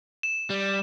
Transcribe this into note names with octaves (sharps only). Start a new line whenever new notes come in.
E7
G3